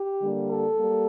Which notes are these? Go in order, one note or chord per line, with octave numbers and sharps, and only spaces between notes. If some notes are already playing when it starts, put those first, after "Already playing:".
Already playing: G4
D3 G3 A#3
A4
G3 A#3